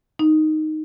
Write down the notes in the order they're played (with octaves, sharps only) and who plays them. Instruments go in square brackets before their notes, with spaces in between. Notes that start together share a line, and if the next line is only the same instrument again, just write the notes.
[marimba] D#4